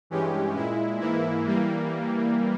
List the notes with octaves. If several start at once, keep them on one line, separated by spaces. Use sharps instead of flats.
G2 E3 G#3 C#4 G4
A#2 G#3 E4
G#2 E3 A#3 E4
E3 G3 A#3